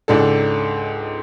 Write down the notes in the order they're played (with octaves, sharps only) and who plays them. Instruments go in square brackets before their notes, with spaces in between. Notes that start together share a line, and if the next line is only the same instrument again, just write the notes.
[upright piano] C#2 G#2 D4 A4